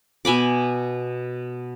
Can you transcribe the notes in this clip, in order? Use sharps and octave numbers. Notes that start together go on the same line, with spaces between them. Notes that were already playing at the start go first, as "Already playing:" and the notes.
B2 G#5 B5 D6